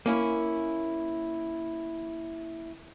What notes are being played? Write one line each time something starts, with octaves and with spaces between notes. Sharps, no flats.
A#3 C#4 E4